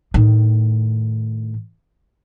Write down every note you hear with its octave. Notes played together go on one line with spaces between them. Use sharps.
A2 D#3